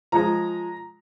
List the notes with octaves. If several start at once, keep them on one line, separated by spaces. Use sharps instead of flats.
F3 G#3 A#5